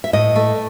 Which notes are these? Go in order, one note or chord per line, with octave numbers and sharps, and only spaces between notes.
E5
A2 D#5
A3